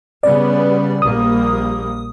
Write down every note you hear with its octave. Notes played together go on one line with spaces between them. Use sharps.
C#3 G3 B3 D5
A#1 G3 A#3 D#6